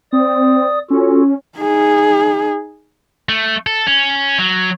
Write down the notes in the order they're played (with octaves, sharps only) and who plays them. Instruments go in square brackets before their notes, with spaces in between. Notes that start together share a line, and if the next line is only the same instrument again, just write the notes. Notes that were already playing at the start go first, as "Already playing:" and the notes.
[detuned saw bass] C4 [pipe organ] D5 D#6
[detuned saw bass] C#4 [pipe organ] F4 F#4 A4
[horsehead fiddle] D#4 G#4
[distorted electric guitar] A3
A4
C#4
F#3